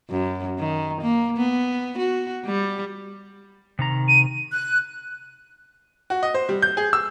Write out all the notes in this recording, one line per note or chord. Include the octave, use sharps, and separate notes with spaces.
F#2
D#3
A#3
B3
F#4
G3
C3 D#3 A#5
D#7
F#6
F#4
D#5
C5
G3
G6
G#4
E6